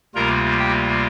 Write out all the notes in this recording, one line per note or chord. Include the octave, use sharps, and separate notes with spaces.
D2 C3 G3 A#3 F4 A#4 A#5
G4 G5